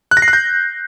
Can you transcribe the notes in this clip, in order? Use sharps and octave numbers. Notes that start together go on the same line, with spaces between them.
F#6
A#6
C7
F#6
G6